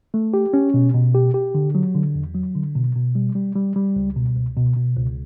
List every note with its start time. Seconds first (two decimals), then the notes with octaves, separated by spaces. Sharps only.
0.14 A3
0.34 G4
0.53 C#4
0.74 B2
0.94 B2
1.15 G4
1.34 G4
1.55 D3
1.75 F#3
1.95 D3
2.15 E2
2.35 F#3
2.56 D3
2.75 B2
2.95 B2
3.15 G3
3.35 G3
3.55 G3
3.76 G3
3.96 C#2
4.16 B2
4.36 C#2
4.56 B2
4.76 B2
4.96 C#2